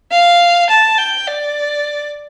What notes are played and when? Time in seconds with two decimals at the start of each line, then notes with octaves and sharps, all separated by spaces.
0.11 F5
0.70 A5
0.98 G5
1.28 D5